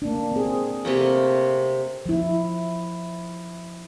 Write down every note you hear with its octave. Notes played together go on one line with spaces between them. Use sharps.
A#3 D4
C4 G#4
C3 A3 A#3
F3 E4